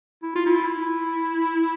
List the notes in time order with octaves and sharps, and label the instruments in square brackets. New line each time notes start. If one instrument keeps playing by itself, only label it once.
[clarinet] E4
F4
E4